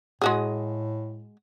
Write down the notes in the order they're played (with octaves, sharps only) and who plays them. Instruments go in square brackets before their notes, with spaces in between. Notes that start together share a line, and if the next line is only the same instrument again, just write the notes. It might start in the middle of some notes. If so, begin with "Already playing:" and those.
[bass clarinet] A2 [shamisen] G#3 F#4 G#4